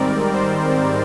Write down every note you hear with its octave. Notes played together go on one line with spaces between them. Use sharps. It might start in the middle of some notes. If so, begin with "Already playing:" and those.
Already playing: G#2 D#3 G3 C4 A#4 D5
C5